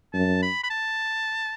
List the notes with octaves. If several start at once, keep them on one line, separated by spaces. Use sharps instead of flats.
F#2 A5
B5
B5
A5